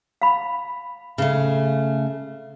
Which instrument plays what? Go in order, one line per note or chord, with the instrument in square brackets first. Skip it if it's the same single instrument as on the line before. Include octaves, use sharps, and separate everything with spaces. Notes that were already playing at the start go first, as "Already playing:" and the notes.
[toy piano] F5 B5
[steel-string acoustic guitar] C#3 A3